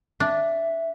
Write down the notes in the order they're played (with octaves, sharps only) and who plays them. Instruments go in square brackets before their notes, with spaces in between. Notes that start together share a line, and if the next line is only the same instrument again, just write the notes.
[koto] D4 [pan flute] E5